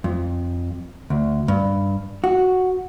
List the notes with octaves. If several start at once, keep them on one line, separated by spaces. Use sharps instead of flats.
F2
D2
G2
F#4